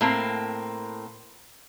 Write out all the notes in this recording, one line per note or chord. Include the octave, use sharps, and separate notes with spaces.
A2 A#3 C4